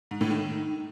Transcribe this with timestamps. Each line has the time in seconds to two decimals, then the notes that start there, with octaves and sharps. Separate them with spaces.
0.11 G#2
0.21 A2
0.31 D#3